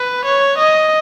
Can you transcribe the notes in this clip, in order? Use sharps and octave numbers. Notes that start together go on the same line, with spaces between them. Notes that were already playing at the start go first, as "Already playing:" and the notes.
Already playing: B4
C#5
D#5